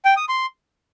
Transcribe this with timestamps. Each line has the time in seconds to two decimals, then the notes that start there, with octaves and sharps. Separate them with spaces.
0.05 G5
0.17 D#6
0.29 C6